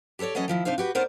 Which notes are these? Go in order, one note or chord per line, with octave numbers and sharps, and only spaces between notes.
G4 A4 B4 C#5 D5
E3 F#3 C#4 A4 D#5
D#3 F3 E4
C3 D4 D#4 C5 F5
F#4 G4 B4
B3 D#4 A#4 C5 D5